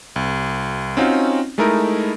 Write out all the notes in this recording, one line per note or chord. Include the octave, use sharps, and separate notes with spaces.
C2
C4 C#4 D#4 F4 F#4
G#3 A3 D#4 E4 A#4